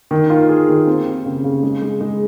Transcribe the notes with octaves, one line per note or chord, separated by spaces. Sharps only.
D#3
F4
G#4
D#3
C4
G4
C#3
C#3
G#3
G#3
G#3